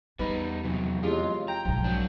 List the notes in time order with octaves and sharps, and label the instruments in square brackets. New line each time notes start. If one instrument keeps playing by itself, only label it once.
[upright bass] E2 [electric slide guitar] G3 D#4 [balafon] B4 B5
[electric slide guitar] F2 C3 F#3 [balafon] E3
[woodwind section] F2 F#3 G#3 [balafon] E4 G4 G#4 [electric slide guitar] F4
[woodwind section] G5 [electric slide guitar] A#5
[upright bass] B1 G#2 [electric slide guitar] F3
[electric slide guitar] F#3 D4